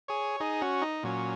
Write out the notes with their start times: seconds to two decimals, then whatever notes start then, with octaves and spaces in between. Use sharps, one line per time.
0.08 G#4 C#5
0.40 D#4 G#4
0.62 C#4 F#4
0.82 D#4
1.03 A#2 F#3 C#4